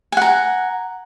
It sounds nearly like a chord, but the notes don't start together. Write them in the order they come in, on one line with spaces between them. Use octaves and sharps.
G#5 F#5 A#5